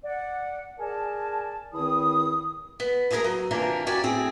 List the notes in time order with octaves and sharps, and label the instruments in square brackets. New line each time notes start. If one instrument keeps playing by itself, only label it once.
[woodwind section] D5 F#5
G#4 A#4 D5 G#5 A5
E2 D#3 C4 E4 D#6
[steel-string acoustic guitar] B3
D2 G2 G#4 A#4 A#5
F#3
C3 E3 A#3 D4 F4 A#4
F#2 F#4 G4 D5 G#5
A2 C4 G#4